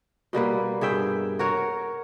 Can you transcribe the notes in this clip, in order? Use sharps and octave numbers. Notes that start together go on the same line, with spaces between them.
B2 G3 A#3 B4
G2 G#4 E5 G5
F#4 A#4 C#5